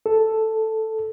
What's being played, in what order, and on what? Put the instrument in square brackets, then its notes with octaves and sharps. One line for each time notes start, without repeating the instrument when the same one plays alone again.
[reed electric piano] A4